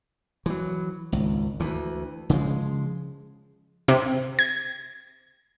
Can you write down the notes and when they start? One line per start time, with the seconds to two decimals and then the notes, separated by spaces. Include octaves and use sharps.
0.46 E3 F#3
1.12 G#1 C#2
1.60 D2 E3
2.30 C#3 F3 G3 G#3
3.88 C3
4.39 G#6